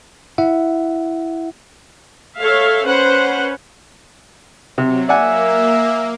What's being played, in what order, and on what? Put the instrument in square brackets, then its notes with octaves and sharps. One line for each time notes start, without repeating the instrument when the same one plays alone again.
[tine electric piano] E4 E5 F#5
[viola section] A4 C#5 E5 F5
C#4 B4 C5 F#5
[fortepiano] C3 [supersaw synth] F#3
[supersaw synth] A#3 [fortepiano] D5 F#5 G#5 [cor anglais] E5